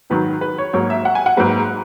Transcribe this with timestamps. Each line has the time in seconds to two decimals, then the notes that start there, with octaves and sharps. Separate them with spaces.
0.10 G#2 D#3 F#3 B4
0.41 B4
0.58 C#5
0.73 G#2 F#3 A#3 C#5
0.90 E5
1.05 F#5
1.15 G#5
1.26 F#5
1.37 G#2 F#3 A#3 B4